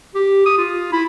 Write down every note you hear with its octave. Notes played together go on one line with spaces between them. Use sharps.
G4
D#6
F4
E4